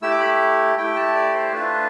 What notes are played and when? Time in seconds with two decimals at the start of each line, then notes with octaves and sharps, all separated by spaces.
0.02 A3 E4 G4 E6
0.11 D6
0.20 B5
0.77 A3 E4 G4 G5
0.96 A5
1.15 D5
1.34 C5
1.52 A3 D4 F4 B4